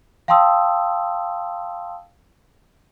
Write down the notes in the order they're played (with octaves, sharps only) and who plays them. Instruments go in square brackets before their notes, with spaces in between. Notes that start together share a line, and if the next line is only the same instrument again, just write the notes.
[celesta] F5 G5 A5 C6 D#6 E6